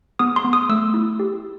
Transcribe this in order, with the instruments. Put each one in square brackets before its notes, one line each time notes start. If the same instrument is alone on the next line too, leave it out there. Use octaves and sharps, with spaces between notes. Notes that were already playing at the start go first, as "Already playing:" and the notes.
[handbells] B3 D#6
C6
B3
D#6
A3 E6
E4
G4